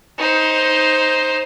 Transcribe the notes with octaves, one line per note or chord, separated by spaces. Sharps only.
D#4 C5